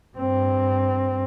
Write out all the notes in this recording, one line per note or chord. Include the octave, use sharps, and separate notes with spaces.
G2 C4